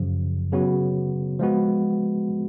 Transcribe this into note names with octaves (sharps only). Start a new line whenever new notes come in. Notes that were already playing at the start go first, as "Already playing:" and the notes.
Already playing: F#2 C#3 F3
C#3 F#3 B3 F#4
F3 G#3 B3 F#4